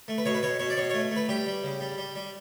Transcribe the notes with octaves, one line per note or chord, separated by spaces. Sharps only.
A3
B4
B2 C#5
B4
B2 C#5
B2 C#5
D5
B2 C#5
C#5
A3
A3 B4
G3 G4
G3
C#3
G3
G3
G3